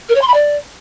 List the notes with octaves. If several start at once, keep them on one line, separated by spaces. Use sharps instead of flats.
A#4
C#5
C6
B5
D5